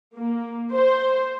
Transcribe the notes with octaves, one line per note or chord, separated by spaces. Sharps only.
A#3
C5